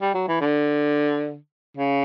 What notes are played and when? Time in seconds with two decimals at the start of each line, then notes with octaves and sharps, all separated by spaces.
0.01 G3
0.14 F#3
0.28 E3
0.41 D3
1.77 C#3